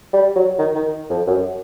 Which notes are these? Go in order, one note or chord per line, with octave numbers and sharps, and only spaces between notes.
G3
F#3
D#3
D#3
F2
F#2